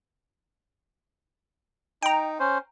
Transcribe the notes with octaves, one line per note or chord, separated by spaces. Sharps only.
D#4 G5 A#5
C#4 C5